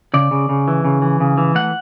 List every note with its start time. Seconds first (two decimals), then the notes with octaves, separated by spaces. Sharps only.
0.14 C#3 D5
0.31 C#3
0.49 C#3
0.68 E3
0.85 C#3
1.02 E3
1.20 C#3
1.38 E3
1.55 A3 F#5